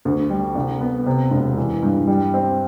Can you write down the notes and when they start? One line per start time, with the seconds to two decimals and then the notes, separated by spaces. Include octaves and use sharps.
0.05 D2
0.30 G3
0.55 C2
0.81 B3
1.06 C3
1.31 E1
1.57 E3
1.83 G2
2.07 G3
2.34 C4